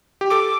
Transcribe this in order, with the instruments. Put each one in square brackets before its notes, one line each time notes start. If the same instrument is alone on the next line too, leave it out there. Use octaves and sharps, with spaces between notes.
[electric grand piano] G4
[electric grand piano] A4 [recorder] D6